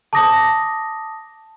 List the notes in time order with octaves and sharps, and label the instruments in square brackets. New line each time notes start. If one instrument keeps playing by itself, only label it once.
[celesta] A5 D6 D#6 A#6